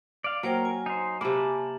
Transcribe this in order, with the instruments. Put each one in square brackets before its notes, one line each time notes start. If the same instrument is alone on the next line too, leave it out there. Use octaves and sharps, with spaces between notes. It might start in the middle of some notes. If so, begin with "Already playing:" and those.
[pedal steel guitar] D5 F5
[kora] F#3 [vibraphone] A#3 C5 G5 [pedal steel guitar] A#4
[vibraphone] G#5
[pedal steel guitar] D#4 C5
[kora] C3 A#3 [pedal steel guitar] A5 B5 D6